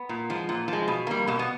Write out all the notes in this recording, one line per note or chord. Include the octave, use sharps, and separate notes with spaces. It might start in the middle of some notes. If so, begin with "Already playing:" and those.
Already playing: B3
A#2
F3 G#3
A#2
F3 G#3
B2
G3 A#3
B2 A#3
B3